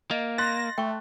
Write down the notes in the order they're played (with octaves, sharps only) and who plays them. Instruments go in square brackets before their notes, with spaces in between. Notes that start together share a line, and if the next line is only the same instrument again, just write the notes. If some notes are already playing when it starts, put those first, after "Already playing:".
[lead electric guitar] A#3 [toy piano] D#5
[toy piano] F5 [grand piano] C6 F#6 A6 [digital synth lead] A#6
[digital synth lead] A3 [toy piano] G5 C6 C#6